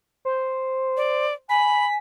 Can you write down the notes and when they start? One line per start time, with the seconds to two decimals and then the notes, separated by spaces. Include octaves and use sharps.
0.25 C5
0.97 D5
1.49 G#5 B5 B6